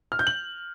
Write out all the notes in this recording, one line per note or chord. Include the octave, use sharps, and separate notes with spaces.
F6
G6
F#7